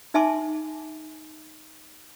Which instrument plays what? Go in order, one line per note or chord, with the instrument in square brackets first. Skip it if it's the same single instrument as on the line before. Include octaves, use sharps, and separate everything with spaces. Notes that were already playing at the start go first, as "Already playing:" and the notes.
[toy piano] D#4 E5 G#5 A5 C6 D6